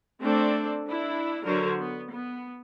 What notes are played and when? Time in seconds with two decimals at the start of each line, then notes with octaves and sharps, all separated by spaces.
0.22 A3 C4 D4 A4 C5 D5
0.88 D4 E4
1.45 D3 F#3 A#4 C5 C#5
1.80 B3
2.13 B3